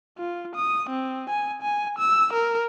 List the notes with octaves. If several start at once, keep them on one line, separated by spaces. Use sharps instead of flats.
F4
D#6
C4
G#5
G#5
E6
A#4